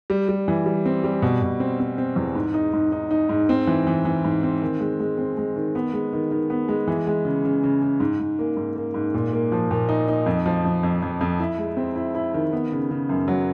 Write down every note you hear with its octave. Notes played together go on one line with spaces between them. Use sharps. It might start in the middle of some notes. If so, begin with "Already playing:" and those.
G3
G3
E3
G3
C4
G3
B2
B2
C4
C4
C4
E2
G#2
D#4
G#2
D#4
D#4
G#2
C4
E3
E3
E3
G#2
C4
D#3
G#3
G#3
C4
G#3
D#3
B3
G#3
D#3
D#3
B3
G#3
E3
G#3
C#3
C#3
C#3
C#3
G#2
G#2
A#3
G#2
A#3
G#2
A#2
A#3
F3
A#2
D#4
D#4
F2
F3
F2
F2
F2
F2
E4
G#3
C4
E4
E4
D#3
B3
C#3
C#3
F#2
F#3